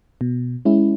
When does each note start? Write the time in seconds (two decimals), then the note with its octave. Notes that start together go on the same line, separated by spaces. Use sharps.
0.21 B2
0.65 G#3 C#4 E4